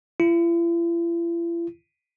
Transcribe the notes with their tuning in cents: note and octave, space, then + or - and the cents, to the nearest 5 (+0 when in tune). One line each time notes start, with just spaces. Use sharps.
E4 +45